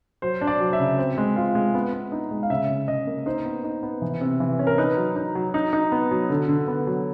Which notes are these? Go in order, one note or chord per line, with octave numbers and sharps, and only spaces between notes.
F#3 C5
D4
D5
F#3
E5
C#3
C4
G#3
F4
G#3
B3
B3
D#4
G#3
F5
C#3 E5
C#3
C#3 D#5
A#3
D#4 C5
B3
D#4
B3
E3
C3
E3
C#4
A#4
D#4 B4
F#3
D#4
F#3
D#4
D#4
B3
F#3
D3
D3
B3
F#3